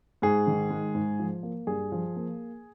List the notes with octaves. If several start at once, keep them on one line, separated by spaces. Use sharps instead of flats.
G#2 G#4
D#3
G#3
G#2
F3
A#3
G2 G#4
F3
A#3